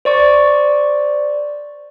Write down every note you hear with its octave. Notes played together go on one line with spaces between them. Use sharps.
C5 D5 C#6